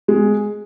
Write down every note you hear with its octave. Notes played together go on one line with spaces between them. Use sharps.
G#3